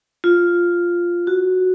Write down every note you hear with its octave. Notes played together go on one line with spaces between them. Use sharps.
F4
F#4